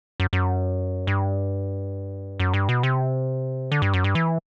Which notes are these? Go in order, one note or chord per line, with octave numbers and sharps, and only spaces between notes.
F#2
F#2
G2
F#2
G2
B2
C3
D3
G2
F#2
G2
E3